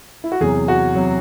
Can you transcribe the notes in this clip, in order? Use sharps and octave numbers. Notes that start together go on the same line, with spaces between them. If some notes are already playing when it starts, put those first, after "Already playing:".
E4
F#4
E2 C3 F#3 G#4
F#4
C3 F#3